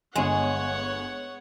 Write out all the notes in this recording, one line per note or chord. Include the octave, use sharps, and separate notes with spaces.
G1 G#3 B3 C#5 F#5 G#5